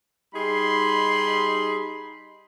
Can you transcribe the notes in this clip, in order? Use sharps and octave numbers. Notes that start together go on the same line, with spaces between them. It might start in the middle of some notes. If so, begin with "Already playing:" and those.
G3 D#4 G#4 B5 C6